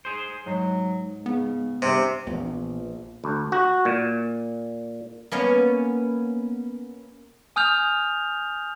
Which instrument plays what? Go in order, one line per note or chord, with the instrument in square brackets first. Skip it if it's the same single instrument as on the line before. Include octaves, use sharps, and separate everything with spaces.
[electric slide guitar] G#4 C5
[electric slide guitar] G#2 [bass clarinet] F#3
[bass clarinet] C#3 [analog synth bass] B3
[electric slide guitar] G2 C4 [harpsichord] C3
[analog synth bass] A#1 [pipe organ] A#2 E3 [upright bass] B3
[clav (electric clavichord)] D2
F#4
A#2
[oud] A#3 B3 C#4
[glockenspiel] G#5 D#6 F6 G6 F7